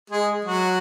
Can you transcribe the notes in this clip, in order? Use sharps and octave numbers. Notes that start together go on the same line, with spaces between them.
G#3 G#4
F#3 F#4